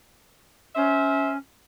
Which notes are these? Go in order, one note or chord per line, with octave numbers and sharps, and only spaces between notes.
C#4 C5 E5